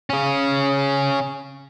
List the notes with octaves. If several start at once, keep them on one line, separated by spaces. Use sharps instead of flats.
C#3 C#4